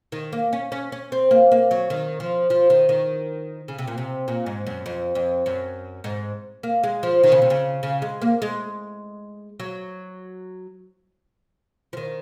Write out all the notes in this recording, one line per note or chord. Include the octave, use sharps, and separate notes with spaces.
D#3
A#3
C#4
C#4
C#4
C4
A#3
A#3
F#3
D#3
F3
F3
D#3
D#3
C#3
C3
A#2
C3
A#2
G#2
F#2
F2
F2
F#2
G#2
A#3
G#3
F3
D#3
C#3
C3
C#3
C#3
G#3
A#3
G#3
F#3
F3
D#3